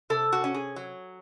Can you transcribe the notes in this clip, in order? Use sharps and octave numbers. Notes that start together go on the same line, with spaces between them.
C3 A4
F#4
C#4
G#4
F#3